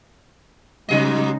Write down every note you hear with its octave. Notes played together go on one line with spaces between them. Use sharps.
G#2 C#3 F#3 G#3 D#4 D#5